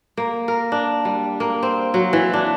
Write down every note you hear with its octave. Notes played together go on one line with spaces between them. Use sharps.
A#3
A#4
D4
G3
A#3
C4
F#3
E3
D4